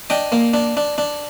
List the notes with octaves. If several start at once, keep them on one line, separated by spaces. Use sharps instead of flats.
D4 D#5 G5
A#3
D4
D4
D4